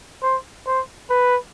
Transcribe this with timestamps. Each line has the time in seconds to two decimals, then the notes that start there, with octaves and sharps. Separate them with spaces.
0.23 C5
0.67 C5
1.10 B4